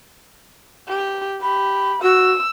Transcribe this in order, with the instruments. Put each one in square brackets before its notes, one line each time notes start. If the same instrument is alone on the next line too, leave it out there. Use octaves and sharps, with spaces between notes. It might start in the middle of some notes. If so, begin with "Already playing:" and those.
[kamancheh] G4
[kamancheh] G4 [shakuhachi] B5
[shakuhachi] F#4 [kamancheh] E6